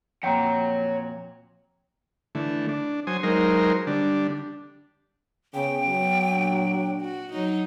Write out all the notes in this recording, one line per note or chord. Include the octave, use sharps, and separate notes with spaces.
F2 A#2 C#5 F#5 G5 A#5
D3 E3 A3
D4
F#3 C5 G#5 D#6
F#3 G#3 D#4 A#4 C5
D3 G3 D4
C#3 B3 G5
F#3 B3
A#2 D4
F#4
F#3 D#4